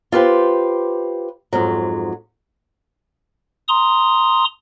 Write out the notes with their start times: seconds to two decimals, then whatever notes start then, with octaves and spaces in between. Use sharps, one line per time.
0.12 F4 G4 B4 C5
1.53 F2 G#2 F#3
3.68 A#5 C6 D#6